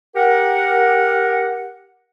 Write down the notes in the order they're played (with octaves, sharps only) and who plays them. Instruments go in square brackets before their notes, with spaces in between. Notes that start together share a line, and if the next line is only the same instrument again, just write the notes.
[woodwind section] G4 A#4 F#5